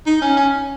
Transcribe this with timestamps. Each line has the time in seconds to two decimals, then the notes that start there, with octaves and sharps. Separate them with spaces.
0.06 D#4
0.22 C#4
0.37 C#4